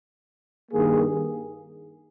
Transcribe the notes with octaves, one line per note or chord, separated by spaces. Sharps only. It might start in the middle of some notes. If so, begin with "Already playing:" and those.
G2 D#3 A#3 G#4